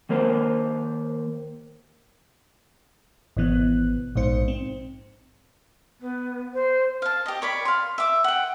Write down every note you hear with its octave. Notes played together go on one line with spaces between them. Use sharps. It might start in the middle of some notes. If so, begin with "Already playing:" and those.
D#3 A#3 A#4 C5
G#1 B2 E3 B3 F#6
A#1 G#2 B2 D#4 C5 C#7
C4
B3
C5
F5 A5
G4 D#5
C#5 D5 B5
F5 C6
E5 D6
F#5 G5